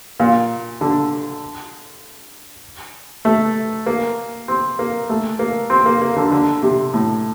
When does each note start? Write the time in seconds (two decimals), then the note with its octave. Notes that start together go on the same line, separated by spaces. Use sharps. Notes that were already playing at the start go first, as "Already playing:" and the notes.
0.20 A#2
0.81 D3
3.25 A3
3.86 A#3
4.48 C4
4.79 A#3
5.09 A3
5.39 A#3
5.70 C4
5.86 A#3
6.02 A#3
6.16 D3
6.32 D3
6.63 C3
6.94 A2